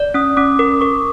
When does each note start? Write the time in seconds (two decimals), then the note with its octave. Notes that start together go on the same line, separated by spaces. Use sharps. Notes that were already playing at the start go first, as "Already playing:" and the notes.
Already playing: D5
0.14 C#4 D#6
0.37 C#4 D6
0.59 A#4 D6
0.81 A#4 C#6